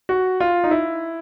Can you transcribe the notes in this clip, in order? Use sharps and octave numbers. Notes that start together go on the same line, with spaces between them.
F#4
F4
D#4
E4